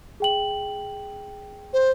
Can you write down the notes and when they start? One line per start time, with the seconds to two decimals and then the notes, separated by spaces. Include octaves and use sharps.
0.20 G#4 G5 F#7
1.73 C5